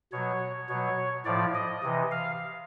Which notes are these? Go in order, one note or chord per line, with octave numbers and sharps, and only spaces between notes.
B2 F#3 C#5
B2 F#3 C#5
A2 F3 D5
D#5
C3 E3
F5